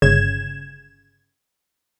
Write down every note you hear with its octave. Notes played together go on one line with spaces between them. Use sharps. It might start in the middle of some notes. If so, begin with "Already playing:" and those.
G1 C#3 G#6 E7